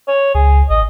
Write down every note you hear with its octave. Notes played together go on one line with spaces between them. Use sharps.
C#5
C#2 G#4
A1 D#5